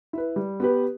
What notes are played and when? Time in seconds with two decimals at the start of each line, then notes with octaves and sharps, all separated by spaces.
0.13 E4 B4
0.36 G3
0.60 B3 G4 B4